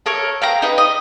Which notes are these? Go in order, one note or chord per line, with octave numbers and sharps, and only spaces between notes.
A4 A#4 C#5
F5 G5 A#5
D#4 B4
D#5